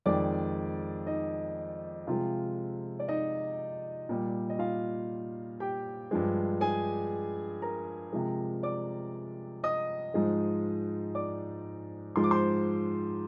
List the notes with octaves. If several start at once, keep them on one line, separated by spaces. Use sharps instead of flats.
F2 D#3 G#3 D5 D6
D#4 D#5
C3 F3 G#3 F4 F5
D5
D#4 D#5
A#2 G3
D#5
F4 F5
G4 G5
G2 F3 G#3
G#4 G#5
A#4 A#5
C3 F3 G#3
D5 D6
D#5 D#6
G#2 F3 G#3
D5 D6
G#2 F3 G#3 C6
D6
C5 C6